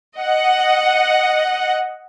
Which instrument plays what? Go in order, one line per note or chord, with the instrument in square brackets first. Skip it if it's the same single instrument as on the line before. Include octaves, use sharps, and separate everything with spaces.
[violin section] D#5 F#5